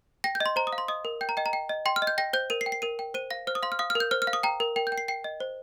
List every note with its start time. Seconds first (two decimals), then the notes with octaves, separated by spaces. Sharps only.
0.24 G5 A#6
0.35 G6
0.40 D#5
0.46 C6
0.56 C5 A#5
0.67 D#6
0.73 F5
0.78 C6
0.88 D#5 D#6
1.05 A#4
1.21 G5 G6
1.29 A#5
1.37 D#5 G5
1.46 A#5
1.53 G5
1.69 D#5
1.86 G5 C6
1.96 F6
2.02 D#5
2.07 G6
2.18 G5 A#6
2.33 C5 G6
2.50 A#4 D#7
2.61 C7
2.66 G5
2.72 C7
2.82 A#4 D#7
2.99 G5
3.14 C5 D#7
3.31 F5 A#6
3.47 C5 F6
3.55 D#6
3.63 F5 C6
3.72 F6
3.79 F5 D#6
3.90 F6
3.95 A#4
4.00 G6
4.11 C5 F6
4.22 F6
4.27 F5
4.33 D#6
4.43 G5 A#5
4.60 A#4
4.76 A#4 G5
4.87 G6
4.92 G5
4.98 C7
5.08 G5 C7
5.24 D#5
5.40 C5